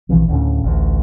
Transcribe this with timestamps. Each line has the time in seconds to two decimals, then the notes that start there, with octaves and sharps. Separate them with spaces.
0.09 A#1 C3 E3 F3
0.28 D2 A2 C#3
0.63 A1 D2